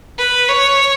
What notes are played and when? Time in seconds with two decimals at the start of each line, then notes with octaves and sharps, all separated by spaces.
0.18 B4
0.49 C#5